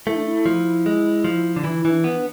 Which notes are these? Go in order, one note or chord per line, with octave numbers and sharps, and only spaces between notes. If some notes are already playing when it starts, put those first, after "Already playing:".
A3 E4
D4
E4
F3
G#3
F3
D3
E3 E4
E3
D4
B3
D4